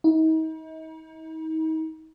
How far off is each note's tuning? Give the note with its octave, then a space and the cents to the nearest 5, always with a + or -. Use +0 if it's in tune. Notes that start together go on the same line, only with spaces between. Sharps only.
D#4 +40